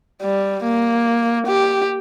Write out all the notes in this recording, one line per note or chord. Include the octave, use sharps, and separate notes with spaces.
G3
A#3
G4